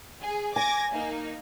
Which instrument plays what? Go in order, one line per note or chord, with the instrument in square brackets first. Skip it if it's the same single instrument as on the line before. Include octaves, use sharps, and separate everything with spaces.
[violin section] G#4
[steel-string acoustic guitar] G#5 [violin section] D6 G#6 A#6
[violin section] A#3 D#4